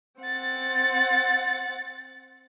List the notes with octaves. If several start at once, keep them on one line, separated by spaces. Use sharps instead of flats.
C4 F#5 A6